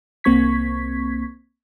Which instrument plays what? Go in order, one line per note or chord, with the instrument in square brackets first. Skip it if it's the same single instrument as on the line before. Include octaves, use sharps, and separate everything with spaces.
[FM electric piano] C2 A#3 C4 C#6 G#6 B6